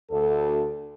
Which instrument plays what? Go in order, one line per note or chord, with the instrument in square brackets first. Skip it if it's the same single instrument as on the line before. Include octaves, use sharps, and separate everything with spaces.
[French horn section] D2 A4